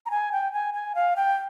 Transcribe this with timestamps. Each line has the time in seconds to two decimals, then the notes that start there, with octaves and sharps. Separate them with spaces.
0.06 A#5
0.11 G#5
0.32 G5
0.53 G#5
0.74 G#5
0.95 F5
1.16 G5